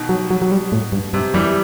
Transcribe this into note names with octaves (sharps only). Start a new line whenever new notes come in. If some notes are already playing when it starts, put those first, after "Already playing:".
Already playing: B2 D#3
F#3
F#3
F#3
G3
A2
G2
G2 C3
F#2 E3 G3